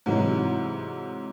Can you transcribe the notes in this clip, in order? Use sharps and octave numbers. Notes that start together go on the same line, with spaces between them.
G#2 C3 E3 F#3 D#4 E4